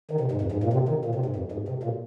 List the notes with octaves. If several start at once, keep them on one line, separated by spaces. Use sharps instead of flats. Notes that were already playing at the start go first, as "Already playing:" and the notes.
D#3
C3
G#2
F2
G#2
A#2
C3
D#3
A#2
C3
G#2
F2
G#2
C3
A#2